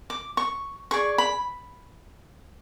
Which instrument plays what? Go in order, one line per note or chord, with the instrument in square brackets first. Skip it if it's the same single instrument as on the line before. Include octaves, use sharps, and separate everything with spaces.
[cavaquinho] D6
C#6
G#4 D5 C#6
B5